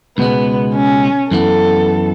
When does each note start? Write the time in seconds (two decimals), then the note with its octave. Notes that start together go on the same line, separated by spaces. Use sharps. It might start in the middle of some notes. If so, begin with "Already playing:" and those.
0.17 C#2 B2 G#3 B3
0.75 C#4
1.31 F#2 E3 B3 A4